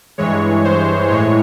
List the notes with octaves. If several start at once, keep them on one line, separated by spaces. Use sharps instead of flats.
G2 E3 G#3 C#5
C5
A2 E3 G#3 C#5